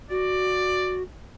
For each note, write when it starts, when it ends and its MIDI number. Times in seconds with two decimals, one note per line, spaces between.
0.10 1.03 66
0.10 0.98 74